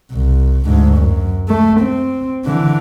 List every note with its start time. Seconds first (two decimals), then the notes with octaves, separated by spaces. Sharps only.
0.12 C2
0.65 D2 G#2
0.97 F#2
1.49 A3
1.80 C4
2.45 D3 E3